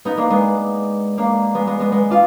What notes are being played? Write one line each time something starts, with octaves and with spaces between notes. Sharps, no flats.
B3 D#4
A#3 D4
G#3 B3
A#3 D4
G#3 B3
G#3 B3
G#3 B3
G#3 B3
D4 F4